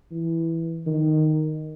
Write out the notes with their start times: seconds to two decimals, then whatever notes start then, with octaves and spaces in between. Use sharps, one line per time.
0.11 E3
0.86 D#3